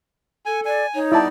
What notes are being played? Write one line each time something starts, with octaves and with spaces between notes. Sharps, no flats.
A4 G#5
D5 G#5
D#4 C#5
G3 B3 E4 D5 A5